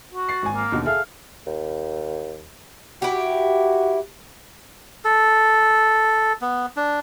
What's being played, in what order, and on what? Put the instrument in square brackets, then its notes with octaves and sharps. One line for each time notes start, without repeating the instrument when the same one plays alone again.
[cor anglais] F#4
[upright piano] A6 C7
G#1 G#5
[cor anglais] A#3
[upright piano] D#2 B2 D3
[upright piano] G#4 A4 E5 [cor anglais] F5
[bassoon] D#2
[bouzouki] E4 G4 [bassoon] F#4
[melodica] A4
B3
D4